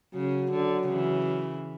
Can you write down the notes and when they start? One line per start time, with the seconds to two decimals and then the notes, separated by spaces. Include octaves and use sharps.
0.15 C#3 F#3
0.51 D3
0.88 C#3 E3